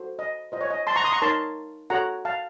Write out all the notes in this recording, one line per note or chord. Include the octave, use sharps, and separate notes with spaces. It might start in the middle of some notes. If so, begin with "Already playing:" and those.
Already playing: F#4 A4 C5
D#5
F4 C5 D#5
C#5
D#5
A5 C6
A#5 C#6
C6 D#6
A#5 C#6
D#4 A#4 C#5 A5 C6
F#4 A4 C#5 F#5 A#5
F5 A5